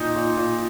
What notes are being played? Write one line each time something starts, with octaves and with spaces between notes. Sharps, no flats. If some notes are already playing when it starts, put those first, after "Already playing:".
Already playing: A#2 D#4 G6
A#2
A#2